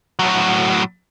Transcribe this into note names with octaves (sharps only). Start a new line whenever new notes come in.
A2 F#3